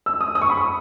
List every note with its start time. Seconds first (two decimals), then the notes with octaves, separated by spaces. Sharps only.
0.06 E6
0.21 D#6
0.35 D#6
0.41 C#6
0.50 B5
0.57 C#6